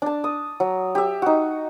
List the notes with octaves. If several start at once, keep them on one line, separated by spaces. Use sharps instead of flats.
D4 A5
D#6
F#3
G4 E5
D#4 F#4